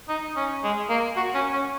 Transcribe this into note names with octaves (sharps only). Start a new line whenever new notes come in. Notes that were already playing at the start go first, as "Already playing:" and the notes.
D#4
C#4
G#3
A#3
F#4
C#4
C#4